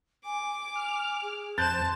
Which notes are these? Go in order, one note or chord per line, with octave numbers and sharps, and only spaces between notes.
G#5 D6
F6
G#4
F2 C4 A5 C6 F#6 G6 A6 E7